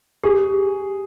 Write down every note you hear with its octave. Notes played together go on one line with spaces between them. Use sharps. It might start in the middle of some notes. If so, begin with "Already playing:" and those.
G4 G#4